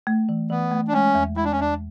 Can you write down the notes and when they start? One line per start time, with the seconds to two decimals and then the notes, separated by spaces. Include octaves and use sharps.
0.07 A3
0.29 E3
0.50 E3 B3
0.71 A3
0.88 D4
0.93 G#3 C#4
1.15 E2
1.36 G#3 E4
1.44 D4
1.52 C#4
1.58 E2 D4